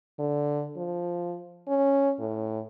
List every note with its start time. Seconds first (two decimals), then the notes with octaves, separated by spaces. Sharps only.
0.19 D3
0.76 F3
1.68 C#4
2.19 A2